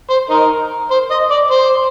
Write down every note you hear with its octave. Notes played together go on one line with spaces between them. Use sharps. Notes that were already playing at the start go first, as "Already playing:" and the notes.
C5
D#4 A#4
C5
D#5
D5
C5